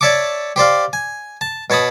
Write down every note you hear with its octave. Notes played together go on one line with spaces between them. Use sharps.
C#5 D5 E5 A5 C#6 D6
G4 C5 D5 F5
G#5
A5
B2 C#5 A5 B5 D#6